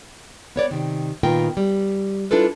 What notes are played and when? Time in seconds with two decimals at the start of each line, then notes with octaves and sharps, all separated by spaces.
0.56 B3 C#5 D5
0.71 C3 D#3
1.23 A#2 D#3 B3 F4 A#4 G5
1.57 G3
2.31 D4 E4 F4 A4 B4